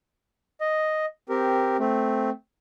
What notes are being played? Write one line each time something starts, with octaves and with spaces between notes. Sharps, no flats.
D#5
C4 G4 A#4
A3 C4